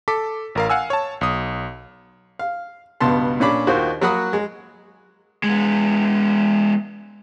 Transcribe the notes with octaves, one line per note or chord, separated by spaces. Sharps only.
A4 D6 B6
A1 A#4 F5
F5 F#5 G#5 E6
C#5 A5
B1 D#6
F5
C#2 G2 B2 B3 A5 C6
A#2 C#4 D4 B5 D6
D#2 D#3 F4 F#4 C5
F#3 A#3 F#4 F#5 B5 D#6
G#3
G#3 B3